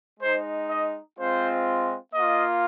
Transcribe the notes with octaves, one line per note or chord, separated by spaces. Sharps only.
G#3 D#4 C5
D#5
G#3 C4 F4 C5
A#3 F4 D#5